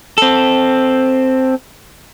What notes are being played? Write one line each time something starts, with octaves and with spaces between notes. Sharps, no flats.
C4 A4